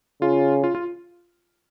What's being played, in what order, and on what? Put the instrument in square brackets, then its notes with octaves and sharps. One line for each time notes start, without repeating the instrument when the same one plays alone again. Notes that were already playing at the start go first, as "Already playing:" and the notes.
[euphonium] C#3 [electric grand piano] F4
[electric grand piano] F4
F4